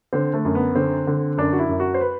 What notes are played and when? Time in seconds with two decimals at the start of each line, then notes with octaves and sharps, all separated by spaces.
0.13 D3 C4
0.34 A3
0.45 F#2
0.55 B3
0.75 D3 C4
1.07 D3
1.37 F#2 D4
1.53 F#4
1.59 E4
1.69 F#2
1.80 F#4
1.94 C5
2.01 B4